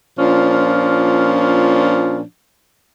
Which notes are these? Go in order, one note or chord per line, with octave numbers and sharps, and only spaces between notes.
A#2 F3 C#4 D4